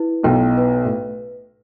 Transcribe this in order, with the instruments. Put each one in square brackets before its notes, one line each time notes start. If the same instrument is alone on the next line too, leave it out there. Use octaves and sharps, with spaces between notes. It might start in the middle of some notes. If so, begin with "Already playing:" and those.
Already playing: [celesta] E4 B4
[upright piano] B1 B2 [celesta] G5
[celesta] B4
[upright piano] A2